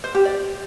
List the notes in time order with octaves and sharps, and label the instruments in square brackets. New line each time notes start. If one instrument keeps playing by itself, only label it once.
[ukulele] C5
G4
D5